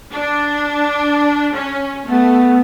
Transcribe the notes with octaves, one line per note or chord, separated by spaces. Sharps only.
D4
C#4
A3 B3